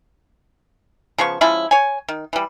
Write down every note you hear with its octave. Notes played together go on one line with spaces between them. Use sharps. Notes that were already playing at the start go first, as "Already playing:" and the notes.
C#3 F3 B3 C#6
F3 G#3 C#4 E4
C#5 G#5
D#3
E3 G3